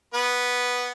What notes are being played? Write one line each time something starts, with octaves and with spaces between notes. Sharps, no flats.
B3 B4